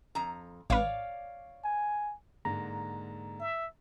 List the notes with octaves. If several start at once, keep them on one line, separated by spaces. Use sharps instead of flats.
F2 A#5
A1 B4 C#5 D5 F5
G#5
G#2 D3 A#3 A#5
E5